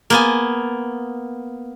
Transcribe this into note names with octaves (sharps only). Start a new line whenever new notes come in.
A#3 B3 G#5